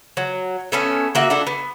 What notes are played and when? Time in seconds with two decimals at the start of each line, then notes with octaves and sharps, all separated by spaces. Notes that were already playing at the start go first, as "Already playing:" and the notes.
0.17 F#3
0.72 A3 B3 C#4
1.15 A#3 F#4 E5
1.30 D4 E4 A4
1.47 B3